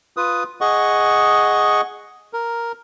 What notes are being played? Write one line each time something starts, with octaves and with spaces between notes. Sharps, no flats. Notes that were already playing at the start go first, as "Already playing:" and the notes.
F4 B4 D#6
G#4 D#5 F#5 C#6
A#4